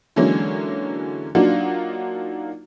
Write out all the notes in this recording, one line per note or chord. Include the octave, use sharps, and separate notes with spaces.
D3 E3 F#3 G#3 A#3 C#4
F#3 A#3 D4 D#4 F4 F#4